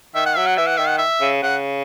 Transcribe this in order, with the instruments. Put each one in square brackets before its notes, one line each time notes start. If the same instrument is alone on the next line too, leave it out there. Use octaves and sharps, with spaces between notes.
[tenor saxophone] D#3 [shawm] E5
[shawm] F#5
[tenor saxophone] F#3 [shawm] E5
[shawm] F#5
[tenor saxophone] E3 [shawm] E5
[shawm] F#5
[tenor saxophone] D#3 [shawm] E5
[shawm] F#5
E5
[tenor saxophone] C#3
[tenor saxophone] C#3 [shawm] F#5